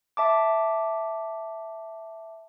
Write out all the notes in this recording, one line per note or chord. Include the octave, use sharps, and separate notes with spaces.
E5 A5 D6